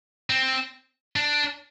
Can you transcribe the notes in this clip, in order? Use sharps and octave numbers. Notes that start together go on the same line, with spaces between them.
C4
D4